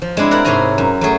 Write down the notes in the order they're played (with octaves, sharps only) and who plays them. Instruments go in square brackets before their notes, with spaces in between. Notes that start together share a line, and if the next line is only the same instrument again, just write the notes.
[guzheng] F3
G#3 C4 D4 E4
E4 A#4 D5 F#5 A#5
G#2 C3 G#4 C#5 G#5 A#5
F#2
F#3 A3 G#4